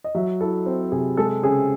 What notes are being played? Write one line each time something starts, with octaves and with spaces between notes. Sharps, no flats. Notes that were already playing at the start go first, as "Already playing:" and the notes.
D#5
F#3 E5
E4 A4
C4 C5
C3 G#4
G#3 A4
C#3 G#4